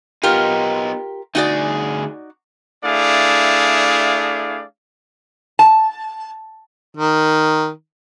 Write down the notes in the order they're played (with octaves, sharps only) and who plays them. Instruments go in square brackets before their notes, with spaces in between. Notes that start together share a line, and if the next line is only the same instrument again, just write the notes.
[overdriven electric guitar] B3 D#4 [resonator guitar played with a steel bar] F4 G4 A#4
[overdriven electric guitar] D2 G#4 [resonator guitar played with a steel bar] D#4 F#4 D5
[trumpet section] A3 D4 E4 G#4 D5 F5
[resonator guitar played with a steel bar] A5
[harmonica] D#3